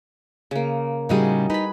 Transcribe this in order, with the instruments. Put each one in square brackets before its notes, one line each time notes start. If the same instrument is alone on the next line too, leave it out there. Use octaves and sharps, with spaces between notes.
[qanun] C#3 A#3
[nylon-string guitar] A2 C#3 G3 [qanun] D#4 F#4 G#4
[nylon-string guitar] D#4 [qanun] B4 B5